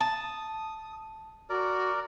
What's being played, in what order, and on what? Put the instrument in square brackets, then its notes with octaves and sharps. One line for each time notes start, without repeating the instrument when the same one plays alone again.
[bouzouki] A5 [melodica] D#6
[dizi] F#4 [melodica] A#4 D5